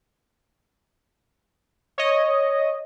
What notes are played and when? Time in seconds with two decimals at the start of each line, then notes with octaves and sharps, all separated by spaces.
1.98 C#5 D#5